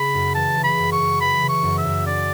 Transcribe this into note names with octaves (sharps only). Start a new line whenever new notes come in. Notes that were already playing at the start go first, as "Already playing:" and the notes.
Already playing: C#3 B5
F#2
E3 A5
C#3
B5
F#2
C#6
F#2
E3 B5
C#3
C#6
F#2
E5
F#2
C#4 D5